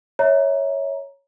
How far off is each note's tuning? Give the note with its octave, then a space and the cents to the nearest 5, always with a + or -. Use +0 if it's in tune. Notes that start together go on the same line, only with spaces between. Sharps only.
C#5 +0 E5 -30 A#5 +10